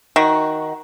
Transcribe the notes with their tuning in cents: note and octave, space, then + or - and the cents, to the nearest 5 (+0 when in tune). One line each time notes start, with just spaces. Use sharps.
D#3 +5 F#4 +0